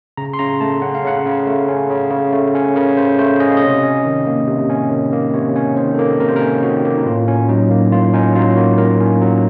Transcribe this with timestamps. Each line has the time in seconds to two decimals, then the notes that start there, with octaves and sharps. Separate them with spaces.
0.17 C#3 A#5
0.34 C6
0.39 C#3 A#5
0.60 A3 A5
0.82 C#4 F#5
0.95 F5
1.04 C#3 F#5
1.25 C#3
1.47 A3
1.69 C#4
1.90 C#3
2.11 C#3
2.32 A3
2.55 C#4
2.76 C#3 A#4
2.87 C#5
2.97 C#3 C5
3.19 A3 C5
3.40 C#4 D#5
3.48 F5
3.57 C3 D#5
3.83 C#4
4.05 D#3
4.27 A#3
4.48 C3
4.70 C#4
4.91 D#3
5.12 A#3
5.34 C3 C#5
5.56 C#4 C#5
5.77 D#3 C5
5.94 A4
5.99 A#3 A#4
6.20 C3 A#4
6.28 C5
6.36 A#4
6.41 C#4
6.63 D#3 F#4
6.85 A#3
6.98 D#4
7.06 A2 F4
7.28 C#4
7.49 F#3 D#4
7.71 A#3
7.92 A2 F4
8.14 C#4 D#4
8.35 F#3 F4
8.57 A#3 F#4
8.78 A2 A#4
9.00 C#4
9.21 F#3